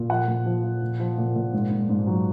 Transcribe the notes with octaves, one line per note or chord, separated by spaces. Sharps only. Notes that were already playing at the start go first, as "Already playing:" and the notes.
Already playing: A#2
F3 F#5
A#2
F3
F3
A#2
F3
A#2
A#2
G#2
G#2
G#2
F#3